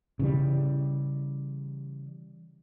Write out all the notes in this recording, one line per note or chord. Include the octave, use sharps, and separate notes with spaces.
C#3 E3 G3